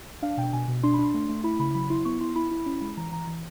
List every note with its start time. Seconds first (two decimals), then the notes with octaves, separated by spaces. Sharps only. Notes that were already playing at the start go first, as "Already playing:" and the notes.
0.22 D4 F5
0.37 B2 G5
0.53 B2 G#5
0.68 B2
0.83 D4 C6
0.94 D4 B5
1.05 C6
1.14 A3
1.29 A3
1.44 E4 B5
1.59 C#3 B5
1.74 F#3 B5
1.90 E4 C6
2.05 B3 C#6
2.21 E4 C6
2.36 E4 B5
2.51 E4
2.66 C#4
2.82 G#3
2.97 E3 A#5
3.12 E3 A#5
3.27 E3